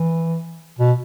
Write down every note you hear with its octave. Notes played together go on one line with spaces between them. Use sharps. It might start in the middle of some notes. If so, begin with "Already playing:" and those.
Already playing: E3
B2